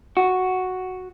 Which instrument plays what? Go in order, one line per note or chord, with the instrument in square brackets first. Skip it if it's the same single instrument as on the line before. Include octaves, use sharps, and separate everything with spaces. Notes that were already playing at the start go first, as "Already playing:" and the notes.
[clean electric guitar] F#4